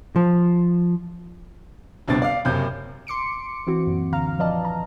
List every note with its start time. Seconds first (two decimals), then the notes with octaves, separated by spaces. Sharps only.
0.16 F3
2.08 G1 C2 B2 C4 D4 A6
2.22 D5 F5
2.45 F#1 F#2 C3 G6
3.07 C6 D6 C#7 D7
3.67 E3 C4 E4 F#4
3.87 F#2 A#2
4.13 D2 D3 F5 A#5 F6
4.39 F3 B4 D5 D#5 A5
4.65 A#5